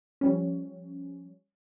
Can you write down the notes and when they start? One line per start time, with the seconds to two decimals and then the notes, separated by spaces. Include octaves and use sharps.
0.21 F3 G3 C#4